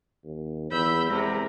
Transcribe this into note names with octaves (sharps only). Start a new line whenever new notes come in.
D#2
E2 B5 E6 G6
E2 C3 G#3 A#4